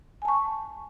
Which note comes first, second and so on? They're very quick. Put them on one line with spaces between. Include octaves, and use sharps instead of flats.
G#5 A5 C#6